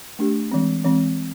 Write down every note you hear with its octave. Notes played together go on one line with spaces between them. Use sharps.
A3 D4 G4
E3 G#3 C4
E3 G#3 C4